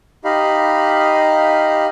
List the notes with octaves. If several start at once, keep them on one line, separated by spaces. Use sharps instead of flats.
D#4 G4 D#5 F5 B5